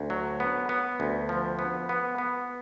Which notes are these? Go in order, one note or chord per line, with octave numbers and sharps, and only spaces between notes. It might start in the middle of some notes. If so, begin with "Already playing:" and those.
Already playing: D2
F#3
B3
B3
D2
F3
B3
B3
B3